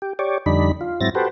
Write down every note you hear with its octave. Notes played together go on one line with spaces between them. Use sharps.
G4
G4 C#5 D5
F2 D3 G3 D4 D#4 B5
F4
G#2 F#3 C4 E4 A6 A#6
F#4 G4 A4 B4 C5